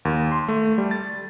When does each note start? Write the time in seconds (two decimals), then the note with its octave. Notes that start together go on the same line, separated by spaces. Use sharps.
0.05 D#2
0.32 C6
0.48 A3
0.78 G3
0.91 A6